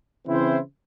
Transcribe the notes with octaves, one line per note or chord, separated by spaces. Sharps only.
C#3 E3 C4 E4 C5